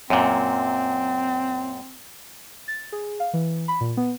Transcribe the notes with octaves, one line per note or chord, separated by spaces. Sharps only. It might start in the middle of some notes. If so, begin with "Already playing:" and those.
F#2 A#2 C4
A6
G#4
F5
E3
B5
A#2
B3